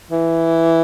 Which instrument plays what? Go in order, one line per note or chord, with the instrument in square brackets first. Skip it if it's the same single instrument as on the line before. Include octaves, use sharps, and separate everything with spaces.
[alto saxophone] E3